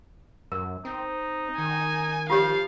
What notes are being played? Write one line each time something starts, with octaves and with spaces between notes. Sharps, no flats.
F#2 A#4
C4 D#4
D#3 G#5
F3 F4 G4 C#5 F5